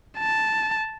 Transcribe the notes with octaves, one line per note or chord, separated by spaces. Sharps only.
A5